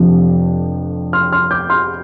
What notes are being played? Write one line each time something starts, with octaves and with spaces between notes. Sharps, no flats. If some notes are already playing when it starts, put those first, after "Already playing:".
Already playing: F1 F2 C3 F3 D4
C6 F6
C6 F6
D6 G6
C6 F6